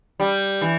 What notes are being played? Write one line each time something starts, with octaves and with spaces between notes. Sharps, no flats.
G3
E3